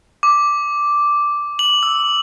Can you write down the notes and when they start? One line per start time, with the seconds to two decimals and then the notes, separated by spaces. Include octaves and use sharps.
0.23 D6
1.59 F#7
1.83 E6